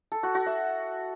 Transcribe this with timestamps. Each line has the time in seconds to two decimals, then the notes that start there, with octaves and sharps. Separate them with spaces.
0.12 A4
0.23 F#4
0.35 F#4
0.46 E5